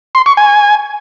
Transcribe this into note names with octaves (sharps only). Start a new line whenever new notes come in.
C6
C#6
G#5